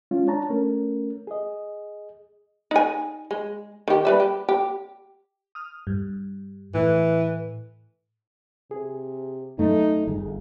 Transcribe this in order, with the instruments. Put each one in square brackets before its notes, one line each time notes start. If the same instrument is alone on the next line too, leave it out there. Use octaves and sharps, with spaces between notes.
[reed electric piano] G#3 C#4 F4
D4 C#5 A5 A#5
A3 C#4 A#4
G#4 D#5
[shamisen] D#4 G#5
G#3
D#3 G4
G3 B4 E5
G4
G4
[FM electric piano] D#6 F6
G2
[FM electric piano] A2 [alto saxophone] E3
[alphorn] C3 [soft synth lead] G#4
[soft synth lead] F#2 [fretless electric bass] A3 [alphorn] D#4
[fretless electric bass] G1 [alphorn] G#4